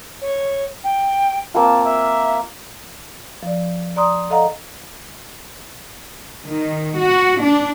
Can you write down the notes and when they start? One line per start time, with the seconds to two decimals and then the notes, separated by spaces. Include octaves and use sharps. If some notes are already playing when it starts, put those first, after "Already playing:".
0.21 C#5
0.84 G5
1.54 A#3 C4 F4 A5
1.85 E5
3.43 F3 D5
3.96 D5 A#5 C6 D#6
4.30 A4 D#5 F5 F#5 A#5
6.47 D#3
6.97 F#4
7.41 D4